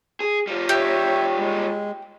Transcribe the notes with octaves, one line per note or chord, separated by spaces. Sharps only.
G#4
G3 F4
G4 C#5 E5
G#3